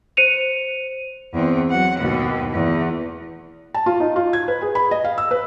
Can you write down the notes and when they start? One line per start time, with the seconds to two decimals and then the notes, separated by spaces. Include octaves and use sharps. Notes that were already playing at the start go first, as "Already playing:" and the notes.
0.17 C5 C#7 D#7 F7
1.33 E2 C4
1.70 F#3 F#5
1.99 D#2 B2
2.53 E2
3.74 A5
3.86 F4
4.00 D#4
4.16 F4
4.33 G#6
4.48 B4
4.62 G#4
4.75 B5
4.91 D#5
5.05 F5
5.18 E6
5.31 B4